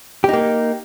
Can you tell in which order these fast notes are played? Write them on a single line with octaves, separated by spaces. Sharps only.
G4 D#4 A#3